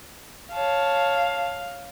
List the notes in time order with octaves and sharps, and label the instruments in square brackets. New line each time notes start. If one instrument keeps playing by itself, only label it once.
[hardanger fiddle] C#5 A5 [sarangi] F5